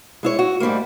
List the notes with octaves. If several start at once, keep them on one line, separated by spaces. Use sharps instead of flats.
G#3 E4 C#5
F#4
G#2 G3 A3 A#3